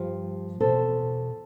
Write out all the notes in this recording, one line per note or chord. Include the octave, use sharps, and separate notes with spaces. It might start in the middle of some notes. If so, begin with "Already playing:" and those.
Already playing: G2 F3 G4
E2 B2 A4 C5